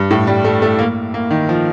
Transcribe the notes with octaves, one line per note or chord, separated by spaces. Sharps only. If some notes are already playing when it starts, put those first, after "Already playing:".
Already playing: G2
A2
G3
A3
A3
A#3
A#3
D#3
F3